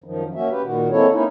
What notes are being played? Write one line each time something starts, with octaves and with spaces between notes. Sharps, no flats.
F#2 D#3 F3
A#3 C#4 F#4 E5
G4 B4
A#2 D#3 F#4
G#3 A#3 C4 E4 A4 C#5
A#3 C#4 D#4 E4